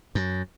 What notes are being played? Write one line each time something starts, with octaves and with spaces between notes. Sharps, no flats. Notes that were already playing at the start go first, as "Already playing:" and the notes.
F#2